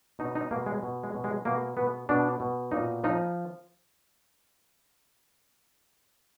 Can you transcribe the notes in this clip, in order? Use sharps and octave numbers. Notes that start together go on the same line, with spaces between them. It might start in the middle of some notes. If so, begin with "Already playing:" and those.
B2 D#4
D#4
B2 A#3
G#3
B2
G#3
B2
G#3
B2 A#3
B2 B3
B2 D4
B2
A#2 D#4
F3 D#4